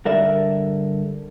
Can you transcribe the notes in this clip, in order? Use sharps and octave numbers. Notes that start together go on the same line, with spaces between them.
G2 D3 A#4 D5 E5